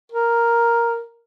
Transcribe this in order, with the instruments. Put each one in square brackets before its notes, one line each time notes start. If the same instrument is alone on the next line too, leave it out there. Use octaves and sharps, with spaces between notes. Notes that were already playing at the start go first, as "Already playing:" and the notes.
[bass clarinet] A#4